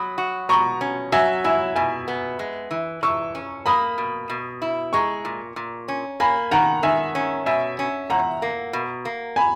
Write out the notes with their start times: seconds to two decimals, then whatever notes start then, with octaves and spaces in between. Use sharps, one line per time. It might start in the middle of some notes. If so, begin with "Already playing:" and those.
Already playing: F#3 B5 D#6
0.18 F#4
0.49 B2 A#5 C#6
0.81 C#4
1.12 F#3 E5 G#5
1.44 E4 E5 G#5
1.75 B2 E5 G#5
2.08 B3
2.39 G#3
2.71 E3
3.03 E3 C#6 E6
3.35 C#4
3.66 A#3 B5 D#6
3.98 B2
4.30 B2
4.62 E4
4.93 G#3 A#5 C#6
5.25 A#2
5.56 A#2
5.88 C#4
6.20 A#3 G#5 B5
6.51 D#3 F#5 A#5
6.83 D#3 E5 G#5
7.15 C#4
7.46 B2 E5 G#5
7.79 C#4
8.10 E2 F#5 A#5
8.42 A#3
8.73 B2
9.05 A#3
9.36 G#5 B5